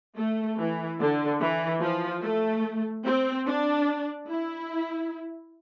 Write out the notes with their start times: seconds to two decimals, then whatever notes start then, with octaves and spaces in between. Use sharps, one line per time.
0.17 A3
0.58 E3
1.00 D3
1.41 E3
1.82 F3
2.23 A3
3.05 C4
3.46 D4
4.28 E4